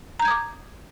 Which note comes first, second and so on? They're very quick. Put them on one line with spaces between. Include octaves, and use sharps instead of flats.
A#5 G6 G#6 D#6 D6